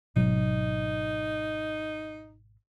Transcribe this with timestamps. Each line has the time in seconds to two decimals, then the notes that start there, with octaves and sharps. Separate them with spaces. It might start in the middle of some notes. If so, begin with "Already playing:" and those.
0.16 G#1 B2 F#3 D#4